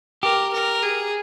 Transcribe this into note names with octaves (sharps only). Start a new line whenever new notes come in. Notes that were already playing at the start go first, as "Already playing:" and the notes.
G4 A#4
A#4
G#4